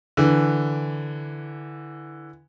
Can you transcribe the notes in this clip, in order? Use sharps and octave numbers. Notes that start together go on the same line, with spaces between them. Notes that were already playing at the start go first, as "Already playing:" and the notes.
D3 E3